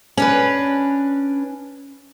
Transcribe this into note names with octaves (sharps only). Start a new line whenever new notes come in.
C#4 D4 B4